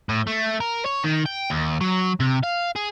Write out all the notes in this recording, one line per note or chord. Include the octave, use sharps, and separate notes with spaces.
A2
A3
A#4
C#5
D#3
G5
D#2
F#3
C3
F5
G#4